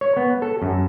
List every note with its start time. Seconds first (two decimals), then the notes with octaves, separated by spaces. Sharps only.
0.01 C#5
0.17 B3
0.42 A4
0.62 F#2